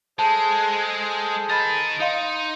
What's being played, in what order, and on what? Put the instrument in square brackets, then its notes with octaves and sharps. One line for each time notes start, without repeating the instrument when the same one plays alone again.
[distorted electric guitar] G#3 [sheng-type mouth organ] G#4 A4 C5 [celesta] A5
[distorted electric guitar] A#4 D#5 [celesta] B5 A6
[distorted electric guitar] D#4 [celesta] D#5 F5 C6